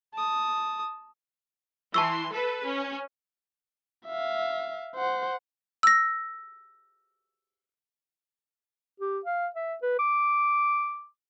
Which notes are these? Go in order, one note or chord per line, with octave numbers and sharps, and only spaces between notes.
A5 D#6
E3 A5 C6 C#6 E6
A4 B4
C#4
E5 F5
C5 F#5
E6 A#6
G4
F5
E5
B4
D6